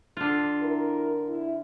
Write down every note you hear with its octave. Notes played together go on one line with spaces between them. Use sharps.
D3 F4
E4 A#4
E4